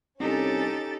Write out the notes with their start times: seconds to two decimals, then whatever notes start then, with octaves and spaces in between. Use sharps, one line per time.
0.20 C2 C#4 D#4 G4 A4 A6